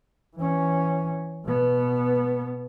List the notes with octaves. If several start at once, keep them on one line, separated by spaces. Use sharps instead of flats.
E3 C#4
B2 B3